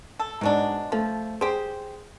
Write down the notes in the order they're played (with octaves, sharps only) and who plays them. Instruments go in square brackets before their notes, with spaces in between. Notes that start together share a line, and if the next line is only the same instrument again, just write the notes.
[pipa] A4
[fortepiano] G#2 [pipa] B2 F#3 D4
[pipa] F3 [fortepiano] A3
[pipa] G4 C5 [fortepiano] G#4